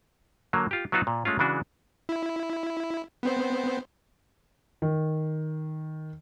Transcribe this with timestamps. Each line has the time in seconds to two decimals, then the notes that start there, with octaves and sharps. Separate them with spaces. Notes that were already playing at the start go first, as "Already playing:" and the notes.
0.53 D3 F#3 A#3
0.71 F4 G4
0.92 F#3 B3 D#4 F4 F#4
1.07 A#2
1.25 G#3 A3 C#4 F4
1.39 C#3 E3 G#3 D4 F#4
2.09 E4
3.23 B3 C4 C5
4.82 D#3